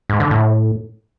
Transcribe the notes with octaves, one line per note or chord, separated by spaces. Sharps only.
G#2
D3
A2